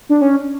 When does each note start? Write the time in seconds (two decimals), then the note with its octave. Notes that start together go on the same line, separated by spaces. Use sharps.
0.09 D4
0.21 C#4